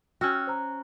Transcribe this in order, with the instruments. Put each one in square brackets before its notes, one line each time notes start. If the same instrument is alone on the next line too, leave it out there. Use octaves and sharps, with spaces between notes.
[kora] C#4 F#4 [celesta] G5 E6 F6
[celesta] C5 A#5